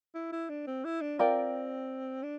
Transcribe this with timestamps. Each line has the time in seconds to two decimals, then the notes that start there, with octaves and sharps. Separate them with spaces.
0.15 E4
0.32 E4
0.49 D4
0.67 C4
0.85 E4
1.01 D4
1.19 C4 F4 A#4 D5 G5
2.23 D4